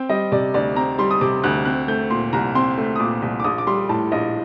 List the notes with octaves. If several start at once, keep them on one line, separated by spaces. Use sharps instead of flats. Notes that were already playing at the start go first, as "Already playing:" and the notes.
Already playing: C4 G5
G3 D#5
C3 D5
D2 D5
C4 A#5
G3 C6
D#6
C3 D6
D2 F#6
C4 F#6
A3 G6
A#2 C6
C2 A#5
C4 C6
A3
D#6
A#2 D6
C2
D6
A#1 D#6
D6
G3 C6
A2 A5
A#1 D#5